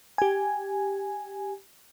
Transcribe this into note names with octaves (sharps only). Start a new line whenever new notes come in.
G4 G#5